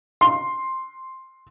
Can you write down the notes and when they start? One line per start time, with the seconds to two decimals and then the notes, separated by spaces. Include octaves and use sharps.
0.21 C6